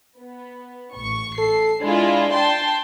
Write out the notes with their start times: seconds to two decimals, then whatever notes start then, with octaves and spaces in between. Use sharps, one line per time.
0.19 B3
0.96 A1 C#6
1.38 A4 C7
1.83 G#3 D4 E4 F4
2.34 G5 A5 C6